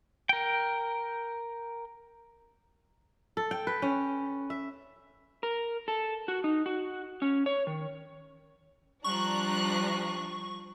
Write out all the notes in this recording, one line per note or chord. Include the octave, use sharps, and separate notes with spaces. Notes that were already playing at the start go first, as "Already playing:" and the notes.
A#4 G5
A4
G5
B4
C#4
E5
A#4
A4
F#4
D#4
F#4
C#4
C#5
D#3
F3 G3 D4 A#5 C#6 F#6